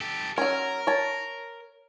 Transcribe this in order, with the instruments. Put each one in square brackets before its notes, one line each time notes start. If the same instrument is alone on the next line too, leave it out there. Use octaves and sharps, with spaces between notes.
[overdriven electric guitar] G4 A4
[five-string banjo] F#3 C#4 [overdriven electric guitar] A#4
[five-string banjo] C#5 A5